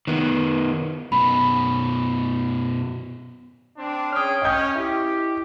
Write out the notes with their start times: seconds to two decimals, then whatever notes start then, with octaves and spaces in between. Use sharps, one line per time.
0.07 D#3 B3
1.12 F#2 B2 B5
3.77 C4 D4
4.12 C#4 G#4 C#5 G5 D#6 F6
4.42 C#4 D#5 G5 D#6 G6
4.76 E4 G4